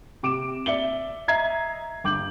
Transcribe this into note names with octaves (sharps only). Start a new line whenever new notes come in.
C3 D6 D7 E7
D5 E5 C#7 G7
D#5 E5 A#5 G#6 C7
G1 D6 G6 F#7